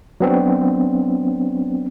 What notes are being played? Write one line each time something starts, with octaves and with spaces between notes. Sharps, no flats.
F#3 B3 C4 D4